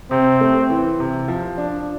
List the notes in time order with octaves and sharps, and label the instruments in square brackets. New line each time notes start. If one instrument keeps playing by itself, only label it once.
[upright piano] C3 [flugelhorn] C4
[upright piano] A3
E3
C3
F3
D4